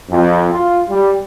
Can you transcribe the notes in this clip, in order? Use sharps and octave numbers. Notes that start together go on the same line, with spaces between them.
F2
F4
G3